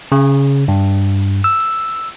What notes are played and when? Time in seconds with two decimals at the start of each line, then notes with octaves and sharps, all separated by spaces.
0.12 C#3
0.68 G2
1.44 E6